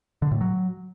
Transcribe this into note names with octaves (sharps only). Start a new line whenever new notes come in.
D3
A2
F#3